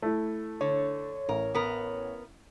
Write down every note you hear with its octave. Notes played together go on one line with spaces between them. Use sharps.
A3 E4
D3 C#5
A1 A#4
B3 A#4